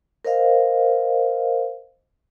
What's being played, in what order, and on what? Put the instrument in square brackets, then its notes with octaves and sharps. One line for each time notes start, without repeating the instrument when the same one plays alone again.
[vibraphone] A#4 C5 D#5 F5